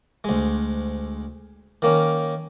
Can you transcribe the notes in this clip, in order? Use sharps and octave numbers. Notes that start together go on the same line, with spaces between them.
D2 G#3
D#3 A#3 C#4